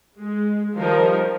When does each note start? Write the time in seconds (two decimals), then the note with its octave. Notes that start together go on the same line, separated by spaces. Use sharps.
0.19 G#3
0.77 D#3 F3 G3 A#4